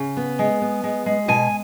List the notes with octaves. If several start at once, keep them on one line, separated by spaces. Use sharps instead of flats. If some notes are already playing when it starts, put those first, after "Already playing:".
Already playing: C#3
B3
G#3
B3
G#3
G#3
B2 G#5